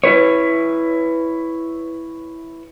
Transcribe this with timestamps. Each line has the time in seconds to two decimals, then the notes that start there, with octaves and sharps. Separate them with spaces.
0.04 E4 B4 C#5